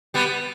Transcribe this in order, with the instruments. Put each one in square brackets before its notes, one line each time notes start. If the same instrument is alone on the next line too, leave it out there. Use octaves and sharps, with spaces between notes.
[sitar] G3 B3